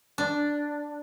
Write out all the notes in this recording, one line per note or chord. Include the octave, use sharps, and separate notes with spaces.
D4